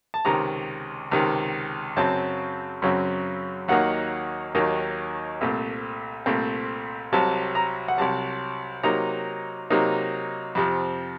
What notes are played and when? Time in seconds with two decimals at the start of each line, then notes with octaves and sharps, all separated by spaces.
0.14 A5
0.25 C#2 C3 D#3 A#5
1.11 C#2 C3 D#3
1.97 F#2 C#3 F#3 C4 A5
2.82 F#2 C#3 F#3 C4
3.68 D#2 D#3 F#3 A#3 D#4 F#5
4.55 D#2 D#3 F#3 A#3 D#4
5.41 C2 A#2 A3 C4
6.26 C2 A#2 A3 C4
7.13 C2 C3 F#3 A5
7.55 A#5
7.88 F#5
7.98 C2 C3 F#3 A5
8.83 C3 F#3 A#3 D#4 A#5
9.70 C3 F#3 A#3 D#4
10.55 F2 C3 F3